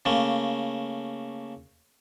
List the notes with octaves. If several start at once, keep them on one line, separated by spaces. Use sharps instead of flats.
C#3 A3 A#3